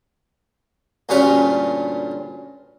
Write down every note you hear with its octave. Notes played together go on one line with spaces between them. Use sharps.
D2 G2 A#2 C#4 B4 A#5